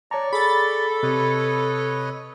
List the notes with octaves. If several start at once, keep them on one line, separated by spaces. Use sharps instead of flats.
C#5 D5 A5 A#5 C#6
G#4 A4 B5 A6
C3 B4 C#5 D#5